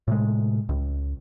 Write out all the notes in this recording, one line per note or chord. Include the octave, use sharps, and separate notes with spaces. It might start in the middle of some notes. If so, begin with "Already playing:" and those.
A2 C3 G#3
C#2